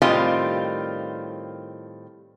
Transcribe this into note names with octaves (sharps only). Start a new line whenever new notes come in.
A2 D#3 G3 C4 F4